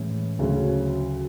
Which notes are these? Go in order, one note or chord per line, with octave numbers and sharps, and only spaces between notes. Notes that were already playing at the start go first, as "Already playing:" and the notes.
Already playing: A2 E3 G#3 C#4
D2 C#3 F#3 C#4